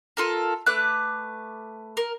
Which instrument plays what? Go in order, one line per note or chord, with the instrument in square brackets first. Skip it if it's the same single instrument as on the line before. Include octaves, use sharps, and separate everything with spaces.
[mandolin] F4 A4 A#4
A3 B4 D6 F#6
A#4